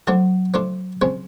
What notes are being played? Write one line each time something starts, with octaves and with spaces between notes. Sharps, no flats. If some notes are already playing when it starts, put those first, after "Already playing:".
F3 F#3 A3 D4 F4
F3 A3 D4 F4
C3 F3 G#3 C#4